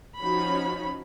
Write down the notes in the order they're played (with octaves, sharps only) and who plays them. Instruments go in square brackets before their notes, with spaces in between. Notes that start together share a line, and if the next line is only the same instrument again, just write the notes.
[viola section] F3 C#4 D#4 F#4 C#5 B5